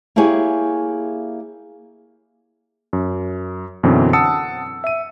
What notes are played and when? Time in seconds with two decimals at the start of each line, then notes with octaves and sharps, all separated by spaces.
0.16 A#3 E4 G4 G#4 C#5 G#5
2.93 F#2
3.83 F#2 B2 D3 E3 C4
4.13 F#5 A5 D#6 E6 C#7
4.84 E5 D#7